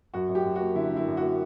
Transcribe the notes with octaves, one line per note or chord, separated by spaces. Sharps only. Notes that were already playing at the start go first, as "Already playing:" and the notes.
F#2 F#4
F#2
G4
F#2
A#3 F#4
D3 E4
D3
E4
F#2
A#3 F#4